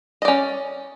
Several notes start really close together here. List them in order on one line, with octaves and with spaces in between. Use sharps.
D#5 D5 C#4